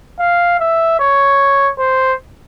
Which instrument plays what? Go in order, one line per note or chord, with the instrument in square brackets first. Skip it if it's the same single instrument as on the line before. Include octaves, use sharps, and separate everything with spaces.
[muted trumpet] F5
E5
C#5
C5